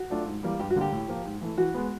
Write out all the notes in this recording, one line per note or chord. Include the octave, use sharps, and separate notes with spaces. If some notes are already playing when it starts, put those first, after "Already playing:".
Already playing: F#4
F#3 A3 D4 F4
G#2
E3 G3 A#3
G2 G4
F#4
D3 G3 A#3 G4
A2
F3 A#3
G#2
E3 A3
E3 F#4
G#3 B3